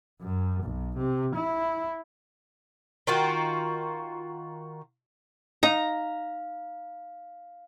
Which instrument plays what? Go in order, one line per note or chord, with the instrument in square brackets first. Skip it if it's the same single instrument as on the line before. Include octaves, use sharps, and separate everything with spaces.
[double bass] F#2
B1
C3
E4
[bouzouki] D#3 F4 F#4 A#4
[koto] D#4 [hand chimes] F5 [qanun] A#5